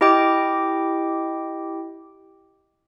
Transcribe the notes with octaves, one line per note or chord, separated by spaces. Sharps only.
E4 G4 D#5 G5 D6